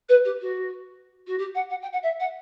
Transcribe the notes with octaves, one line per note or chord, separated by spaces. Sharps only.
B4
G4
F#4
F#4
G4
F#5
F#5
G5
F#5
E5
F#5